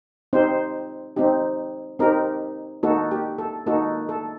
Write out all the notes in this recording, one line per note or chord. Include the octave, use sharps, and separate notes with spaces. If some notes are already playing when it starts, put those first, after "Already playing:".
C4 D#4 G4 C5
C4 D#4 G4
C4 D#4 G4 A#4
A#3 D#4 F#4 A4
G4
A4
A#3 D#4 F#4 A4
A4